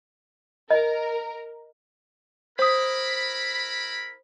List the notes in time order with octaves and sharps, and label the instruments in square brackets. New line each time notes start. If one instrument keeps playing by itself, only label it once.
[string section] A#4 [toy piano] D#5
[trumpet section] E4 A#4 B5 [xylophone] C5 D#6